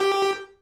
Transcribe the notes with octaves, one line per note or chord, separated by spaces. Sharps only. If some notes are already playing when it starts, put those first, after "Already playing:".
Already playing: G4